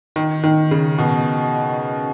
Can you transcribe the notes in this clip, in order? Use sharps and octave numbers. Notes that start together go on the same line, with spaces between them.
D#3
D#3
C#3
B2